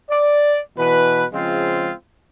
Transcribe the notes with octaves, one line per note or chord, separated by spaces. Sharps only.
D5
B2 E3 B4
C#3 F3 G#3 C4 F4